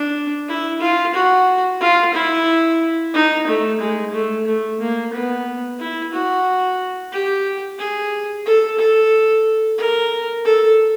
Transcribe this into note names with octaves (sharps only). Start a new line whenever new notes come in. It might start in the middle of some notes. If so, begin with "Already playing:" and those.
Already playing: D4
E4
F4
F#4
F4
E4
D#4
A3
G#3
A3
A3
A#3
B3
E4
F#4
G4
G#4
A4
A4
A#4
A4